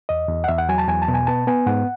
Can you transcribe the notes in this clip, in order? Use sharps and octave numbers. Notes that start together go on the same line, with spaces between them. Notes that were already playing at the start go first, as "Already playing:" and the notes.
E2 D#5
E2
F#5
E2 E5
F#5
F#3 G#5
A5
E2 G#5
A5
B2
G#5
B3 A5
B3 G#5
G#2 F#5